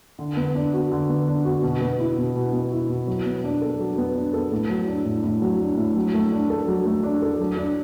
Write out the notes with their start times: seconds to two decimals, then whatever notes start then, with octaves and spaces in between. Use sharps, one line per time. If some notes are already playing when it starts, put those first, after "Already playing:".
0.19 D3
0.37 B3
0.55 D4
0.73 F#4
0.92 D3
1.09 B3
1.28 D4
1.45 F#4
1.63 B2
1.81 B3
2.00 E4
2.18 B2
2.36 B2
2.53 B3
2.72 E4
2.89 B2
3.07 F#3
3.26 B3
3.44 D4
3.62 A4
3.80 F#3
3.98 B3
4.15 D4
4.33 A4
4.52 A2
4.69 F#3
4.87 D4
5.05 A2
5.24 A2
5.42 F#3
5.60 D4
5.77 A2
5.96 F#3
6.14 A3
6.32 D4
6.50 A4
6.67 F#3
6.85 A3
7.03 D4
7.22 A4
7.40 F#3
7.57 D4